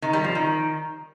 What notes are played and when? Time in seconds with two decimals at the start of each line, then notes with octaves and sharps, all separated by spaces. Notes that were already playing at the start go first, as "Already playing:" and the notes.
0.02 D#3
0.13 G3
0.24 F3
0.35 D#3